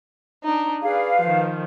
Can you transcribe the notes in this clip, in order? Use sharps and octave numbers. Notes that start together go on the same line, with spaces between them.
D4 D#4
G#4 B4 D5 F5
D#3 F3